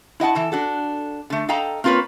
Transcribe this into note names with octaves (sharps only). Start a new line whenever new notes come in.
E4 D#5 F#5 A5
E3 A4 A5
D4 F#4 A4
D3 A3
A4 D#5 F5 G5 A#5
A#3 C4 F4 A#4 B4 C#5